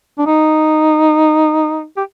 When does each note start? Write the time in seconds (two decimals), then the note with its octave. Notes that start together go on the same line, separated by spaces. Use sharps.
0.18 D4
0.27 D#4
1.97 G4